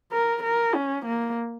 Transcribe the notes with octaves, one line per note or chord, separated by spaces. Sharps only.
A#4
A#4
C#4
A#3